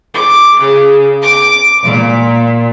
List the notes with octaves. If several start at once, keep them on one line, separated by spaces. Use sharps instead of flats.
D6
C#3
D6
A#2